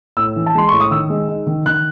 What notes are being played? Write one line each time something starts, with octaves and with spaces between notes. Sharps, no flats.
A2 E6
E3
A5
G#3 C6
A2 C#6
D#6
D#3 E6
G#3
D#4
D#3
D#3 F#6